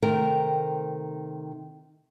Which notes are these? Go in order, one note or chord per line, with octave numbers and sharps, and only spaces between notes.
C3 D#3 A3 A#4 G5